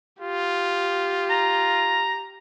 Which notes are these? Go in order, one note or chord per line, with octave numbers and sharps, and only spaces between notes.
F4 G4
A#5